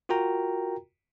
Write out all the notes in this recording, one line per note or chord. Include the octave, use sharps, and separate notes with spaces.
F4 F#4 A#4 G5 A#5